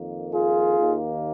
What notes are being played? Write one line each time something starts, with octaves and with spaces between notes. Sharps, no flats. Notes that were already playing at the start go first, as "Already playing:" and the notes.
Already playing: F2 D#3 A#3
F4 G#4
D#2 D#3 A#3